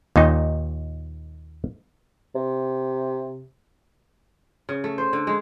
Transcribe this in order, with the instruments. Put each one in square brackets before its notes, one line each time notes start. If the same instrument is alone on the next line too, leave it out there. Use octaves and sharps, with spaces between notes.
[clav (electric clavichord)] D#2 A#2 D#4
[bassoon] C3
[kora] C#3
A3
C5
D3
G#3